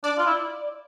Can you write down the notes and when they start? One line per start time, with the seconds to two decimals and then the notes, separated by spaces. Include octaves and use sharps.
0.04 D4 D5
0.18 F4
0.26 E4